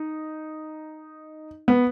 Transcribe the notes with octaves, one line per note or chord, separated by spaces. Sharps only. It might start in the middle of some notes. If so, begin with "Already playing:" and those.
Already playing: D#4
B3